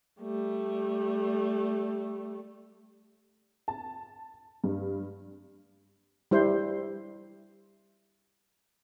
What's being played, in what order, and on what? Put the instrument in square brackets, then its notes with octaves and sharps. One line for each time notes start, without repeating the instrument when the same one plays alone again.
[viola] G3 A3
[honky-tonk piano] A5
G2
[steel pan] G3 E4 C5